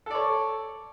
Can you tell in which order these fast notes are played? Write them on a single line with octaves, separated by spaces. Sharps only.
A4 D5 C#5